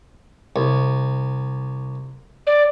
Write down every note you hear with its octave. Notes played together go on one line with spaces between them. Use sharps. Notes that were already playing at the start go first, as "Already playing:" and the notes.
C2
D5